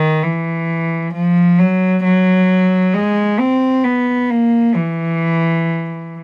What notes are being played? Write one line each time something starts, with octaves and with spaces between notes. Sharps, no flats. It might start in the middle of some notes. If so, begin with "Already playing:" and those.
Already playing: D#3
E3
F3
F#3
F#3
G#3
C4
B3
A#3
E3